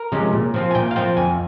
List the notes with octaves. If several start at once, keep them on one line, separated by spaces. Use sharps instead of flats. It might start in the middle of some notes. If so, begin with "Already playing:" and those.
Already playing: A#4
C3 F3 G#3 C#4
A#2
F3 C4 F4
G#5
A#2 G5
F5
F3 C4 F4 G5
F2 G#5